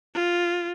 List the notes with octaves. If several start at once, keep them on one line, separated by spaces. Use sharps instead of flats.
F4